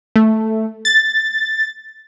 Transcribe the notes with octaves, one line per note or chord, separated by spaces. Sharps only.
A3
A6